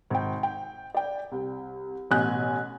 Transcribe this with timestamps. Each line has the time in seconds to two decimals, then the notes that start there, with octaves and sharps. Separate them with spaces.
0.10 G#1 G5
0.43 G5
0.94 D5 G5
1.32 C2
2.11 A1 B2 G#5 F#6